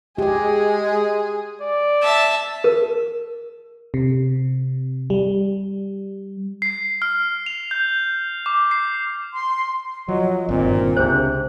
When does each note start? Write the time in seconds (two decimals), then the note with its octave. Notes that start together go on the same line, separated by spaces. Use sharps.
0.18 G#3 G4 G#4 D#5
1.61 D5
2.03 E5 A5
2.64 A#4
3.94 C3
5.10 G3
6.62 C7
7.02 F6
7.46 F7
7.71 G6
8.46 D6
8.71 C7
9.34 C6
10.08 F3 F#3 D#5
10.49 G1 G2 A#2 D#3 C4
10.97 C#2 C3 D4 G#4 C5